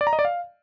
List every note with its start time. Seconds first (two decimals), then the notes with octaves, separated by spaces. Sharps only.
0.01 D5
0.07 A#5
0.13 D#5
0.19 D5
0.25 F5